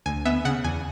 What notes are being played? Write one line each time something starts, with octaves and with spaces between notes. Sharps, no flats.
D2 G#5
B3 E5
C#3 F#5
E2 G#5